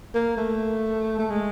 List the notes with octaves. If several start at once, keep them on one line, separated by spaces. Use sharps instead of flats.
A#3
A3
A3
G#3